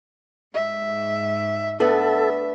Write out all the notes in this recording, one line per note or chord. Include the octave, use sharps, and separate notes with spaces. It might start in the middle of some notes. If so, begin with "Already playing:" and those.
G#2 E5
A3 B3 D4 A4 E5